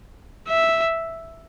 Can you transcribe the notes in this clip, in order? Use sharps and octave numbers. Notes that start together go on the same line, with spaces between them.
E5